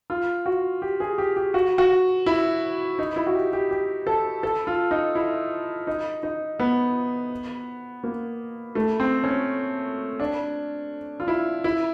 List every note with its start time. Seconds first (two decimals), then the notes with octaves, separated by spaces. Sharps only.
0.10 F4
0.46 F#4
0.82 G4
1.00 G#4
1.18 G4
1.36 G4
1.54 F#4
1.78 F#4
2.26 E4
2.99 D#4
3.16 E4
3.27 F#4
3.35 G4
3.53 G4
3.71 G4
4.07 A4
4.43 A4
4.67 F4
4.91 D#4
5.15 E4
5.87 D#4
6.23 D#4
6.59 B3
8.04 A#3
8.75 A3
9.00 C4
9.24 C#4
10.20 D4
11.20 F4
11.28 E4
11.64 E4